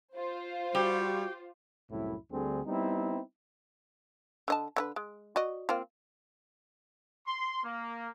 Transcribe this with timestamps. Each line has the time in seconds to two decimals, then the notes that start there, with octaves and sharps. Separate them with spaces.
0.14 F4 C5
0.75 G3 F#4 G4
1.91 C2 F#2 A2 E4
2.31 D2 D3 G3 C4 G#4
2.65 G3 B3 C4 D#4 E4
4.48 D3 D#5 A5
4.76 D3 E4 B4
4.96 G#3
5.36 F#4 D5 D#5
5.69 A#3 C4 F4
7.27 C6
7.64 A#3